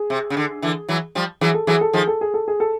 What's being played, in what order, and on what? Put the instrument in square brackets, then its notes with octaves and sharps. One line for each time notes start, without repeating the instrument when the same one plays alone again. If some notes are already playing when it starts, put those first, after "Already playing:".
Already playing: [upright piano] G#4
[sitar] C3
C#3
D3
D3 E3
E3 F#3
F3 G3
[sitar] E3 F#3 [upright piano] G#4
[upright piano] A4
[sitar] E3 F#3 [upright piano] G#4
[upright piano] A4
[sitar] D#3 F3 [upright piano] G#4
[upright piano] A4
G#4
A4
G#4
A4